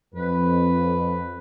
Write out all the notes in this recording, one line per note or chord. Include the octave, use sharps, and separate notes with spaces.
F2 B4